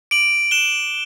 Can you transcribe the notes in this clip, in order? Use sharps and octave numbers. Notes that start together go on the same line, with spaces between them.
D6 D7 F#7
F#6 E7 G7